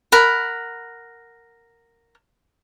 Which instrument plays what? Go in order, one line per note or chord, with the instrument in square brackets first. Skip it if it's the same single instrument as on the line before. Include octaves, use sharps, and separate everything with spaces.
[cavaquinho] A#4 F#5 B5